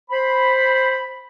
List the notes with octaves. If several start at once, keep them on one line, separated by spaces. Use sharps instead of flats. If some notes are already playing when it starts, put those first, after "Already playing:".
C5 B5